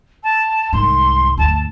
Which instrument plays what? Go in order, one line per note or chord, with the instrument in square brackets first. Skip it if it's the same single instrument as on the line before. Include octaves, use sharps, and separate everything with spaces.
[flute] A5
[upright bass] C2 G#2 [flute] C6
[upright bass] D2 G2 [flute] A5